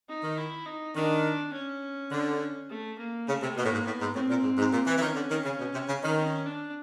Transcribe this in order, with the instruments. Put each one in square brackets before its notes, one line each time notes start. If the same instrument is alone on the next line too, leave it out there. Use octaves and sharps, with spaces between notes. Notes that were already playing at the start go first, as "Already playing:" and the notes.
[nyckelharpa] D#4
[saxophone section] D#3
[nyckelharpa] E4
D#4
[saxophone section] D#3 [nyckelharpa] D4
[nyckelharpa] C#4
[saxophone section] D3
[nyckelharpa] A3
A#3
[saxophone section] C#3 [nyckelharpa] A3
[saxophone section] C3
[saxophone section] B2 [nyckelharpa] A#3
[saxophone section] A2
G#2
[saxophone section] A2 [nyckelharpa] B3
[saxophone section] G#2
[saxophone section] A2 [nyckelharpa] C4
[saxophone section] A#2
G#2
G#2
A#2
E3
E3
[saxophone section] D#3 [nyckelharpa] C#4
[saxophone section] D3
D#3
C#3
B2
C3
C#3
D#3
[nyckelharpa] C#4
D4